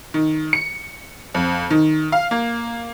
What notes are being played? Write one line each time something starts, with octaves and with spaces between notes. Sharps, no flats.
D#3
C#7
F2
D#3
F5
A#3